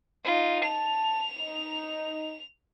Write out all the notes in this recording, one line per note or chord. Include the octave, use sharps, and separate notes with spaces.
D#4 F4
A5 F7
D#4